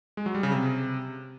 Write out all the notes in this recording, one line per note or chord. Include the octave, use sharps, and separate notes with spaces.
G#3
F#3
G3
C#3
C3